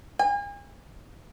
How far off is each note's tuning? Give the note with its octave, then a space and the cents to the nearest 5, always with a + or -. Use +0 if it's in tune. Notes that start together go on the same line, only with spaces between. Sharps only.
G#5 -40